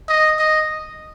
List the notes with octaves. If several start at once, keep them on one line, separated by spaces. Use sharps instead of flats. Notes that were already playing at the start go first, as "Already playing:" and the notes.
D#5
D#5